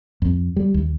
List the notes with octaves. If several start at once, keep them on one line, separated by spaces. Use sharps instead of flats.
F2
G3
D#2